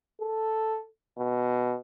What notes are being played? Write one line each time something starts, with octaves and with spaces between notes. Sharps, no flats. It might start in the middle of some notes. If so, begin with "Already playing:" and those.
A4
B2